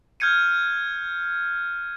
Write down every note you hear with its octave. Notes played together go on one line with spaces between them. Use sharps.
F6 G6 G#6 C#7 D#7